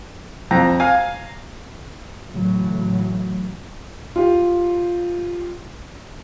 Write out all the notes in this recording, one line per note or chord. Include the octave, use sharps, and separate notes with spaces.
F2 A#5
F5 G#5
A2 C#3 E3 F#3 A3
F4 G4